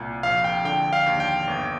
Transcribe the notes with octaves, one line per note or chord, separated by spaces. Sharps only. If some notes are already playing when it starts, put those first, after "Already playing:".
Already playing: C2 A#2
A#1 F5
G5
D3 G5
F5
D#2
G5
G1